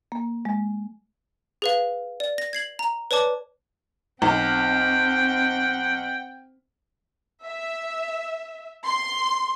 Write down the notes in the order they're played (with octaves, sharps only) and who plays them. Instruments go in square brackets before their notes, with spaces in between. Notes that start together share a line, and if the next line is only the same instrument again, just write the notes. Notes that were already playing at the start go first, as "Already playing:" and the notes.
[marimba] A#3
G#3
[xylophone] G#4 B4 F5
D5
A#6
G#6 C7 F#7
A#5
B4 C#5 D5 A5 D6
[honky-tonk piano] B1 [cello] C4 [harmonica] F#5 G5
[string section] E5
C6